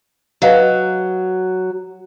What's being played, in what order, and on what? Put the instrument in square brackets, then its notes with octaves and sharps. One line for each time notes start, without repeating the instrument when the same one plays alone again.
[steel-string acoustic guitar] F#3 [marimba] B4 D#5 F5